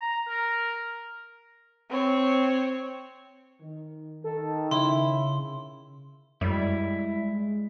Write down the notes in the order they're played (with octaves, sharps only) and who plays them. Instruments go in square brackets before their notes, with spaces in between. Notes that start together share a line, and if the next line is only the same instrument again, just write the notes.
[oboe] A#5
A#4
[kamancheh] C4 C#5
[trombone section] D#3
[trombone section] D#3 [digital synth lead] A4
[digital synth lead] C#3 [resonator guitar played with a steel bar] E4 [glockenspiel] C6
[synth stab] F#2 [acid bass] G3 [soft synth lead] G#3 [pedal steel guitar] E4